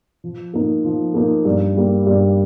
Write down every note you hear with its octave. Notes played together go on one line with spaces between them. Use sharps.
F3
A#3 D#4 A#4
F3
A#3 D#4 A#4
G2
G3 A#3
G2